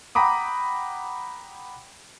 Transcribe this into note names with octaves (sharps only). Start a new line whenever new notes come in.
F#5 G5 A#5 B5 D6 D#6